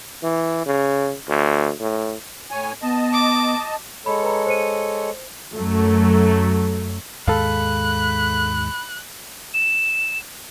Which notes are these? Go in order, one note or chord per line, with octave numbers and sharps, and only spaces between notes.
E3
C#3
D2
A2
A2 C#5 G#5
B3 D#5 A5
D6
G#3 A4 C#5 B5
B4 A#5 B5
C5 C#7 D#7
F#2 F#3 A3
D#2 G#2 G#3 A4 F5 B5 F#6
E7